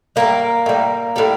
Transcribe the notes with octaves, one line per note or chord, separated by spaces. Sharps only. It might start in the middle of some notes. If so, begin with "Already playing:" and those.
A2 G3 A#3
A2 G3
A2 G3